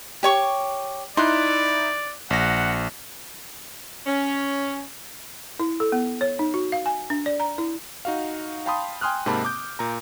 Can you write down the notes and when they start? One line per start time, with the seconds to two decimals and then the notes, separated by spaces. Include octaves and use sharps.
0.23 G4 C#5 C#6
1.17 D#4 E4 D5 C6 F#6
2.30 A#1 F#5 A#6
4.07 C#4
5.60 E4
5.80 A4
5.92 B3
6.21 C#5
6.39 D#4
6.54 F#4
6.72 F5
6.86 G#5
7.10 D4
7.26 D5
7.40 A#5
7.58 E4
8.05 D#4 F#4 F5
8.66 F5 G5 A5 B5 C6 D#6
9.01 G5 G#5 C6 D#6 F6 F#6
9.26 G#2 C3 A#3 C4 A5 B5
9.45 D6 G6
9.79 A#2 A#5